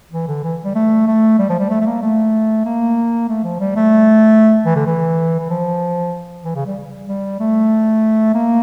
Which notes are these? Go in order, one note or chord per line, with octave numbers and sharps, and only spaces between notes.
E3
D3
E3
G3
A3
A3
G3
F3
G3
A3
A3
A#3
A3
A#3
A3
F3
G3
A3
E3
D3
E3
E3
F3
E3
C#3
G3
G3
A3
A#3